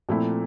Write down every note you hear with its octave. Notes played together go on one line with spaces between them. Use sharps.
A#2 F3 A3 C4 E4